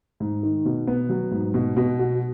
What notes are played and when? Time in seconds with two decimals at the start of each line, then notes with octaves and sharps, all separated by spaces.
0.20 G#2
0.43 D#3
0.65 B2
0.87 B3
1.09 F#3
1.31 G#2
1.54 B2
1.77 B2
1.99 F#4